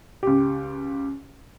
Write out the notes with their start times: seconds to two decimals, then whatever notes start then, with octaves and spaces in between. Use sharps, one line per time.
0.23 C#2 G4